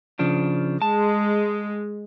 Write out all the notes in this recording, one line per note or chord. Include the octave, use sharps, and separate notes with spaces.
C#3 F3 D4
G#3 A5